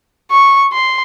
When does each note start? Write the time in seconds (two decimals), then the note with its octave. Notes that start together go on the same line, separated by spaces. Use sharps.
0.31 C#6
0.72 C6